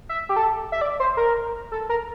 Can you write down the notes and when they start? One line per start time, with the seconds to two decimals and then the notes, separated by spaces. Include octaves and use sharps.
0.09 E5
0.29 G4
0.36 A4
0.72 E5
0.81 D5
1.00 C5
1.17 A#4
1.72 A4
1.89 A#4